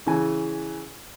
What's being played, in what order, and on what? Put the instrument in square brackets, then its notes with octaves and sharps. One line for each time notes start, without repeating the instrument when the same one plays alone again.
[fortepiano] C#3 E3 G#5